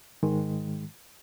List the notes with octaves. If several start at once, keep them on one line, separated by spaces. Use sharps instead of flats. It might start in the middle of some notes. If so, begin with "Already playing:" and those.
G#2 D#3 G#3